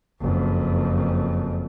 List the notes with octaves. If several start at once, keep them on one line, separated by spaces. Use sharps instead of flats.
F#1 F2